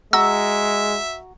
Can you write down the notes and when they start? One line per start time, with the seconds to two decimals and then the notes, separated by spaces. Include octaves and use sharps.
0.13 G#3 F#4 E5 A#5 E6